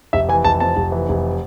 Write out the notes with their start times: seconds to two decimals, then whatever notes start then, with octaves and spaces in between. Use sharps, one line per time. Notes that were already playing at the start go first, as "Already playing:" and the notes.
0.13 F1 E5
0.29 E3 G#5
0.45 F1 A5
0.60 F2 A5
0.77 F1
0.92 E3
1.09 F1